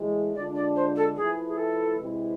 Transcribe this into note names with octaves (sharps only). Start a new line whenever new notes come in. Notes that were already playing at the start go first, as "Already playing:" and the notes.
Already playing: A2 E3 G#3
D3 G#3 D4 F4 D5
D5
C5
A4
F3 A3 E4 G#4 B4
G#4
A4
C3 G#3 C4 E4 B4